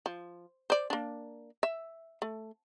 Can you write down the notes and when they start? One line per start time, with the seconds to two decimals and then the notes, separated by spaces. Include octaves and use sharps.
0.06 F3
0.70 C5 D5
0.90 A#3 D4
1.63 E5
2.22 A3